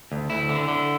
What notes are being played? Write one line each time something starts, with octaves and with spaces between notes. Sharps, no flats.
D2
D2 E4
D3
D3